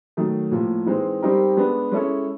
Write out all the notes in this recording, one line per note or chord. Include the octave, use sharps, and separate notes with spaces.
D#3 F#3 A3
A2 F3 A#3
E3 G#3 C4 D#4
G3 C4 D#4 G4 A#4
G#3 B3 D4
G#3 C#4 E4 A4 C#5